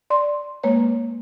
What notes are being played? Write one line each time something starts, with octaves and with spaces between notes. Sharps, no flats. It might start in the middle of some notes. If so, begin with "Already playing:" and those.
D5 C6
G#3 A#3 B4 C#5